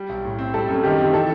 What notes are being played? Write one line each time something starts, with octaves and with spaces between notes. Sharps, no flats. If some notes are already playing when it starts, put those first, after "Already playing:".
Already playing: G3
B1
A2
C4
G3 A4
F#2
D#3 G4
C4 G4
E3 A4